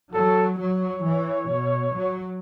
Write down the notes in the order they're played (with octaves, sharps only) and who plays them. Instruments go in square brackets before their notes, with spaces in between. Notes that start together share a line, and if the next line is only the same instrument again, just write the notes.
[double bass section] F#3 [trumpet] A4
[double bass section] F#3 [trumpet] C#5
[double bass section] E3
B2
F#3